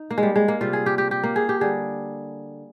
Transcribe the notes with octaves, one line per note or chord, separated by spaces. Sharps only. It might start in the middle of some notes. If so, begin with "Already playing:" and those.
Already playing: D#4
A#3
G#3
G3
G#3
A#3
C3 G3 F4
G#4
G4
G4
G4
A#3
G#4
G4
D3 G3 G#4